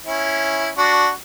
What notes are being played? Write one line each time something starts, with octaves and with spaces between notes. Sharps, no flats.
C#4 E4
D4 F#4